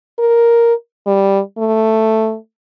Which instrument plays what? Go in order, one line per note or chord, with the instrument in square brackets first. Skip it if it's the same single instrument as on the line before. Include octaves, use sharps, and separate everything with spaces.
[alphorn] A#4
G3
A3